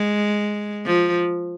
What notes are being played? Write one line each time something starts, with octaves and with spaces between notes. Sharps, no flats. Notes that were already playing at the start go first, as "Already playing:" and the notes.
Already playing: G#3
F3